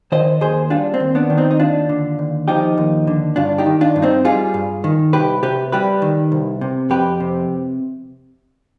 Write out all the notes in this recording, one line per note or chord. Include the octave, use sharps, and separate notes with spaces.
D#3 C5 D#5
D#2 G#4 C5
G3 D4 F4
C4
D#2
B3 D4
D#3
C4 D#4
D#4
D#2 D4 F4
D3
D#2
F3 D#4 G4
D#2
D3
G2 D4 F4
D#4 G4
D#3
D4 F4
G2
C4 D#4
G3 F4 G#4
G2
D#3
C2 G4 B4
C3 G4 B4
G3 G4 B4
D#3
C2
C3
F2 G4 B4
C3